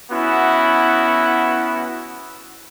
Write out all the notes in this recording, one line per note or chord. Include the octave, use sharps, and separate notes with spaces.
B3 C#4 E4 F#4